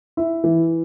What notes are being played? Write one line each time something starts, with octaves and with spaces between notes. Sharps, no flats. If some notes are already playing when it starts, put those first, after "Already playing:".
E4
E3